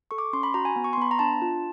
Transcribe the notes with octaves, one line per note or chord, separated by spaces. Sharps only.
A4 C#6
D6
C#4 C6
B5
F#4 A#5
G#5
B3
C#6
C6
B3 B5
A#5
D4 A5
F4